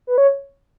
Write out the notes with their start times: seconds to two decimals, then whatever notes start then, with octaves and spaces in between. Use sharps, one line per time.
0.07 B4
0.18 C#5